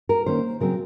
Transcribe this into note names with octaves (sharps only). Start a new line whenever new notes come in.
A#4
D#3 A#3 C#4 C5
C#3 F#3 C4 A#4